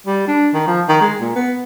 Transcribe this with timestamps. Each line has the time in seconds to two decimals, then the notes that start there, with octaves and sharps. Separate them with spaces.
0.07 G3
0.28 D4
0.53 D#3
0.67 F3
0.88 D#3
1.01 G#3
1.20 A#2
1.35 B3